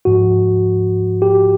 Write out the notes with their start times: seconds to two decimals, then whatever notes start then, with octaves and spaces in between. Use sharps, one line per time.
0.05 G#2 F3 F#4
1.22 G4